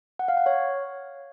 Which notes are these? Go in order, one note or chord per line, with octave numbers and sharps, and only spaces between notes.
F#5
F5
F#5
C#5